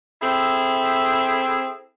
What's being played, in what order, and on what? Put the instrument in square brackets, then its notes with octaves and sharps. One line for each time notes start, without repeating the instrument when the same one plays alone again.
[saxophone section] C4 E4 G#4 A4 E5